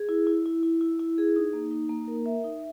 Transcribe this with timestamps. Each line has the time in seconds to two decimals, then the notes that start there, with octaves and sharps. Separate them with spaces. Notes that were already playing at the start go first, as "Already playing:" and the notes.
Already playing: G#4
0.09 E4
0.27 E4
0.46 E4
0.63 E4
0.81 E4
0.99 E4
1.18 G#4
1.36 D#4
1.53 A#3
1.71 D#4
1.89 A#3
2.08 A#4
2.26 E5
2.44 D#4